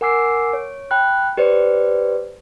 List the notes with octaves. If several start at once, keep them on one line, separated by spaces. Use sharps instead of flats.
A#4 F#5 G#5 D6 E6 C7
C#5
G5 B5 F#6
G4 B4 C5 D5